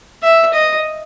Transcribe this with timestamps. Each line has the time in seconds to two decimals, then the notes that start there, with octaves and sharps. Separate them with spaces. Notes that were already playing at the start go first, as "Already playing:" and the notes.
0.23 E5
0.54 D#5